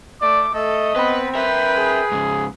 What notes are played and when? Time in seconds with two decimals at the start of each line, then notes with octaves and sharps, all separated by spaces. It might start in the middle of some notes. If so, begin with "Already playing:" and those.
0.21 A3 D5 D6
0.54 A3 A4 D#5
0.96 B3 C4 B4 B5
1.35 A#4 B4 E5 G5
1.77 G#4
2.12 G#2 C#3